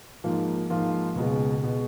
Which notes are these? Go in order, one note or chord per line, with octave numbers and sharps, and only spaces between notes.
G#2 F3 A#3 F4
G#2 F3 A#3 F4
C#2 B2 G#3
B2 G#3